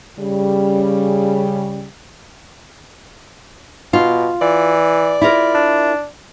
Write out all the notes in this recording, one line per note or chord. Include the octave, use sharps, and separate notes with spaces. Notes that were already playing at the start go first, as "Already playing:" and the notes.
C#3 G3
B2 F4
E3 D5
E4 F4 A#4
D4